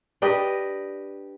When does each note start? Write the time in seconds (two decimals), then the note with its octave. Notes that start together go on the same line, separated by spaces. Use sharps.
0.22 D4 G4 B4 D#5